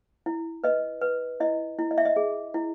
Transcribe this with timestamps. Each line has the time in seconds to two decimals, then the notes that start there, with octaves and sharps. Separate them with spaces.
0.26 E4
0.64 B4 D#5
1.01 B4
1.40 E4 D#5
1.79 E4
1.91 D#5
1.98 E5
2.05 D#5
2.16 G#4
2.54 E4